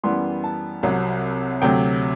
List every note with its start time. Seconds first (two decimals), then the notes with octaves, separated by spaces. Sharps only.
0.03 F#2 E3 G3 B3 C6
0.44 A5
0.83 C2 C3 F#3
1.62 D2 C3 F#3 G5